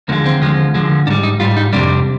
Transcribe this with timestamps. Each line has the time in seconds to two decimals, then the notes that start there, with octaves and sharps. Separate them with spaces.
0.08 D#2 D3 F3 G#3 A#3
0.25 C4
0.41 D#2 D3 F3 G#3
0.74 D#2 D3 F3 G#3
1.07 G#2 D4
1.10 G3
1.23 D#4
1.40 G#2 G3 F4
1.57 D#4
1.73 F2 C3 G3 D4